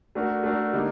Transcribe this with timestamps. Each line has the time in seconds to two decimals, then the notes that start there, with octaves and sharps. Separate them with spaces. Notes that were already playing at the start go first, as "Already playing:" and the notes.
0.15 A3 D4 F#4 A#4
0.43 A3 D4 F#4 A#4
0.73 D3 G3 A#3 D#4